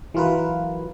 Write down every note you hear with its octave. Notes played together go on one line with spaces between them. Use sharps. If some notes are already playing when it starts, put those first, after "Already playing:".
E3 F#3 F4 A#4 B4